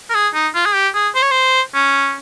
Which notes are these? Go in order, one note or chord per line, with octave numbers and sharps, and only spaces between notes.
A#4
G#4
D#4
F4
G#4
G4
G#4
C5
C#5
C5
C#4